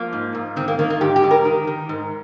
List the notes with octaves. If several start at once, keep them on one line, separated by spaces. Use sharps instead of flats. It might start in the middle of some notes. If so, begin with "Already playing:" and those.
Already playing: F3 A#3
G#2
G#2
D#3 C4
A#3
D#3 A#3
A#3
G#2 G4
G4
G#2
A#4
D#3
D#3
G#2